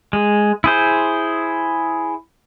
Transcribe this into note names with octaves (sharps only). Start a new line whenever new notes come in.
G#3
E4 G#4 C5